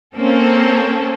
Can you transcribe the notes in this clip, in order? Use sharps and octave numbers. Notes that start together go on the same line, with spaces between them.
A#3 C4 C#4 A4